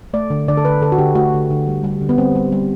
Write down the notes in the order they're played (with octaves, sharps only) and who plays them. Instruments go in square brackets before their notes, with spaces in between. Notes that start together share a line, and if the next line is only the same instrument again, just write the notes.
[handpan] A3 D5
D3
D3 D5
A4
D3 B4
D3 A4
F#4
D3 G4
A3 F#4
D3
D3
G3
G3
D3
B3
G3 C4
G3
G3